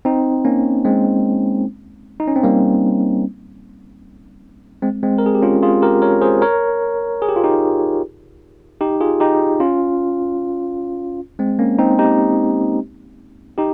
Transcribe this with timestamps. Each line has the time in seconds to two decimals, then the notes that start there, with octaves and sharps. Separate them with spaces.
0.05 C4 D#4
0.45 A#3 C#4
0.85 G#3 C4
2.20 D#4
2.28 C#4
2.36 C4
2.44 G3 A#3
4.82 G#3 C4
5.03 G#3 C4
5.18 A#4
5.26 G#4
5.35 G4
5.42 C#4 F4
5.63 F4 G#4
5.82 G4 A#4
6.02 A#4 C#5
6.22 G#4 C5
6.42 A#4 C#5
7.22 G#4
7.29 G4
7.36 F4
7.44 D#4 G4
8.81 D#4 G4
9.00 F4 G#4
9.20 D#4 G4
9.60 C#4 F4
11.39 G#3 C4
11.59 A#3 C#4
11.79 C4 D#4
11.99 D#4 G4
13.58 D#4 G4